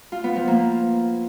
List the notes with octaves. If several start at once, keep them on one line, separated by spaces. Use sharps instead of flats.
F4
B3
F3
A#3